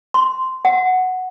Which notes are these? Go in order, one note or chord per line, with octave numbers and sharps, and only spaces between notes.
C6
F#5